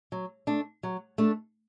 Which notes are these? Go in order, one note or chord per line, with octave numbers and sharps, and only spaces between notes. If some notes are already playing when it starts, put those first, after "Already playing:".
F#3
A3 D4
F#3
A3 D4